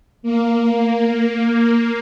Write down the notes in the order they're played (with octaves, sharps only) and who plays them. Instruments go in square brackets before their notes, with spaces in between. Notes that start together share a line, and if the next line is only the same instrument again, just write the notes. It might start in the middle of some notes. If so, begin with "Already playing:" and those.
[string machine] A#3